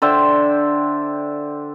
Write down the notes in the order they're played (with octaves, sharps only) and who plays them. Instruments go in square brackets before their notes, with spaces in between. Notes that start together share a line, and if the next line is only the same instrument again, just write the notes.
[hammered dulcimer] D3 C5 E5 G5